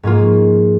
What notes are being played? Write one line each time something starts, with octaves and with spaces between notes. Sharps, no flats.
G#2 F3 A#3 C#4 F4